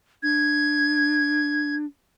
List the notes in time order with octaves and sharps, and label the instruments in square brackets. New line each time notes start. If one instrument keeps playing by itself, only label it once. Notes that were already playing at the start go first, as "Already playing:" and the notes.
[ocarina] D4 [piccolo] G#6